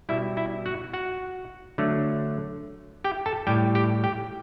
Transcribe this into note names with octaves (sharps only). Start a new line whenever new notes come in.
B2 G3 E4 E5
E4 E5
F#4 F#5
F#4 F#5
D3 F#3 A3
G4 G5
A4 A5
A2 G3 G4 G5
G4 G5
G4 G5